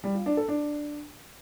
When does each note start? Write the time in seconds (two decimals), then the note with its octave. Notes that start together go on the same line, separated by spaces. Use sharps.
0.04 G3
0.15 F4
0.26 D4
0.37 A4
0.49 D4